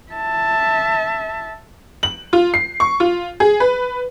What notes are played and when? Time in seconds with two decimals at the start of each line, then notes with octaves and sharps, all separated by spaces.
0.12 E5 A5
2.03 F#7
2.33 F4
2.54 C7
2.80 C#6
3.00 F4
3.40 G#4
3.60 B4